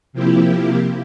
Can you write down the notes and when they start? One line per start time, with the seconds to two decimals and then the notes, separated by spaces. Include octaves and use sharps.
0.13 C3 F3 A#3 E4 G4